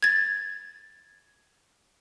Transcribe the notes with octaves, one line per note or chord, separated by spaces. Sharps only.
G#6 A6